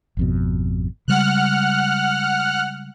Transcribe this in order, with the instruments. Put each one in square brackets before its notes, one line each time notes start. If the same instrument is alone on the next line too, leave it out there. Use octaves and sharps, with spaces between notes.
[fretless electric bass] G#1 F2 B2
[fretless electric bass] C#3 G3 G#3 [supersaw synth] F#5 F6 F#6